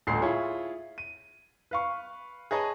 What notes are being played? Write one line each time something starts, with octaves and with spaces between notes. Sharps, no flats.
D#1 A1 D2 A4 C6 C7
E4 F4 G#4 C#5
D#7
B4 F5 C#6
G#4 B4 C#5 D#5 A5 A#5